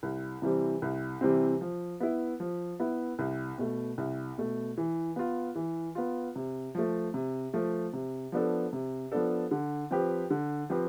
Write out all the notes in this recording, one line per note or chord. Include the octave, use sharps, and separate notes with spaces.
C2
C3 E3 G3 C4
C2
C3 E3 G3 C4
F3
B3 E4
F3
B3 E4
C2
B2 A3
C2
B2 A3
E3
B3 F4
E3
B3 F4
C3
F3 A3
C3
F3 A3
C3
F3 B3 D4 A4
C3
F3 B3 D4 A4
D3
F3 C4 G4 B4
D3
F3 C4 G4 B4